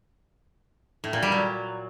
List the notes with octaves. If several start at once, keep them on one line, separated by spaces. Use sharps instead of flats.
A2
A#2
G3
F#3